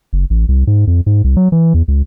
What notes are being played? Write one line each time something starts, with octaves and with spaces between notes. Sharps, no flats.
F#1
A1
C2
G#2
F2
G#2
C2
F#3
E3
E2
C#2